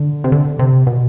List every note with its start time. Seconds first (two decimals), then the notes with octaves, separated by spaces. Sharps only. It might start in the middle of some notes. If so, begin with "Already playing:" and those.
Already playing: D3
0.24 C3
0.32 D3
0.59 C3
0.87 B2